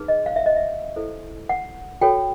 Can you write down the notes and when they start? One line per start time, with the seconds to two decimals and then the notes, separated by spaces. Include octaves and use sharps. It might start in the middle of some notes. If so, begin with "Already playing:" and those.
Already playing: D#4 G#4 B4
0.08 D#5
0.26 F5
0.36 E5
0.46 D#5
0.56 E5
0.96 E4 A4 C5
1.49 F#5
2.01 F#4 A4 C#5 G5